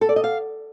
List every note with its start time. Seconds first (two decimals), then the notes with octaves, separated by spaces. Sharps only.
0.01 A4
0.09 D5
0.16 D#5
0.24 F5